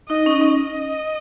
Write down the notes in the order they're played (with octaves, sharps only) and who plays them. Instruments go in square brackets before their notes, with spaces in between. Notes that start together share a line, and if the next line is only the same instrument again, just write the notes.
[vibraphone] D#4 [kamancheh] D#5
[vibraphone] C#4
D#4
C#4
[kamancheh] D#5